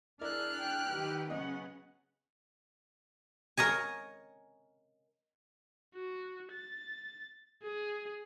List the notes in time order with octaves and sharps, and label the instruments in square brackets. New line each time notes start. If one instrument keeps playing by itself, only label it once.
[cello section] D4 G#4 [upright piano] E4 A#4 D5 [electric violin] F6 F#6
[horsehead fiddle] G5
[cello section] D#3 G4 B4
[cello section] C#3 B3 C#4 [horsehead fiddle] F#3 F#5 [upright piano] D#5
[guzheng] A#4 C#5 D#5 G#5
[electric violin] F#4
A6
G#4